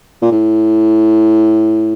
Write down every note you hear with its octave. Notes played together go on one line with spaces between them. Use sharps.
A#2
A2